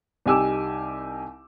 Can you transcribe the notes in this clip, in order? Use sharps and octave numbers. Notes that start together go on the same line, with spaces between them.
C2 D#4 G4 G#5 D6 E6